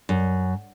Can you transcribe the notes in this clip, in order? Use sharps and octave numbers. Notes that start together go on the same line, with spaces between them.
F#2